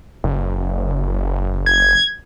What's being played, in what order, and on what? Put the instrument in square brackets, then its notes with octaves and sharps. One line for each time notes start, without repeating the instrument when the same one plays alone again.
[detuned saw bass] F#1
[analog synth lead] G#6